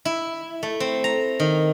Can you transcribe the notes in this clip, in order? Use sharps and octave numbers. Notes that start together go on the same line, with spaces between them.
E4
A3
C4
A#5
D#3